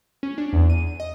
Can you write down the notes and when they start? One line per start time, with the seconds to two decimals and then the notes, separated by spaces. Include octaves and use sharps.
0.23 C#4
0.38 D4
0.53 E2
0.70 D#7
1.00 D#5